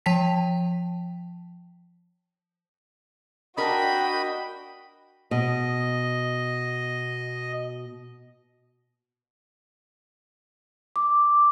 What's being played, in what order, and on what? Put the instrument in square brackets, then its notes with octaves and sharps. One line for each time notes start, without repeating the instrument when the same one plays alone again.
[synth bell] F3 G5 A5 B6
[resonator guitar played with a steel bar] D4 A#4 [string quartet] F#4 G5 [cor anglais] D#5 [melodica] B5
[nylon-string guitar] B2 [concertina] D#5
[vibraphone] D6